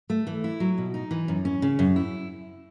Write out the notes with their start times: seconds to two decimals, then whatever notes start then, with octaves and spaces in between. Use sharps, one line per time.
0.10 A3
0.27 E3
0.44 E4
0.60 F#3
0.78 B2
0.94 D#4
1.11 E3
1.28 F#2
1.45 C#4
1.62 C#3
1.79 F#2
1.96 E4